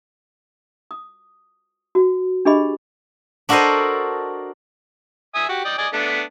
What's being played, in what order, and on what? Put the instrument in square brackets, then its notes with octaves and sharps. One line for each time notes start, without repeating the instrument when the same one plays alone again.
[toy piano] D#6
F#4
D4 G4 G#4 D#5 B5
[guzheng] D4 F#4 A4 A#4 C5 D#5
[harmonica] E5 G#5 D#6
F#4 G4
D5 D#5 G5
D5 D#5 G#5
A3 B3 D4